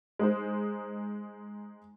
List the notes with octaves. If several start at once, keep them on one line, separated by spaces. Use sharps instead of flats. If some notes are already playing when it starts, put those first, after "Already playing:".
G#3 D#4 C5